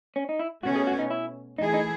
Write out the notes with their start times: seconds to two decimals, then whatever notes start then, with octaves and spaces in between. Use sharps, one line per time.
0.16 C#4
0.29 D#4
0.39 E4
0.63 B2 A3 C#4 F#4
0.76 G#4
0.87 F#4
0.99 D#4
1.11 E4
1.58 E3 A3 D#4 E4 G#4
1.74 D#4